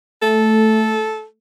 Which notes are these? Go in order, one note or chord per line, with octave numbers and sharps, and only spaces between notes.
A3 A4